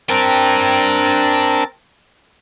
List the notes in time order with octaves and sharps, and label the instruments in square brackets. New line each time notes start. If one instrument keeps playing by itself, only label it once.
[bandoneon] C4 A#4 A5 [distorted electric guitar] D4 G5